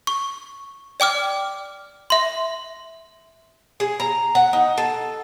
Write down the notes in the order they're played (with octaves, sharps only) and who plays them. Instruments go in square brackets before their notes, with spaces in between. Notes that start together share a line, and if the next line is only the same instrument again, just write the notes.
[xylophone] C#6
D5 G5 D6 F6
E5 C6
[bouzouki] G#4
A#5
F#5
D#4
A4